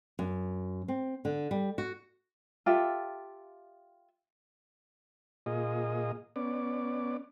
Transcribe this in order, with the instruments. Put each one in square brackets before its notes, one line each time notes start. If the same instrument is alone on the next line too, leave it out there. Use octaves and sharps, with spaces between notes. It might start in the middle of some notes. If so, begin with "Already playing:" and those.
[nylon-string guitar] F#2
C4
D3
G3
F#4
[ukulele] F4 G4 A4 E5
[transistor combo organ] A#2 F4 G#4 D#5
B3 C#4 D5